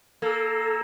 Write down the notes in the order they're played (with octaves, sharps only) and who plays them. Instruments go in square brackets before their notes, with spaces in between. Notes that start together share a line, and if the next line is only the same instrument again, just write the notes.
[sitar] A#3 [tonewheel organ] A4